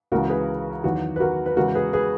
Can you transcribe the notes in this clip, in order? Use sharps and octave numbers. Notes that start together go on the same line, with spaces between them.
C#2 C#3 E3 G#3 F#4 A#4
G#4 B4
E2 D#3 F#3 F#4
B4
F#4 A#4
B4
E2 C#3 G#3 F#4 A#4
G#4 B4
G#4 B4